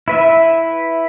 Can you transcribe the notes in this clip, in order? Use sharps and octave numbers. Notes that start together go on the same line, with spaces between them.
E4 B4 E5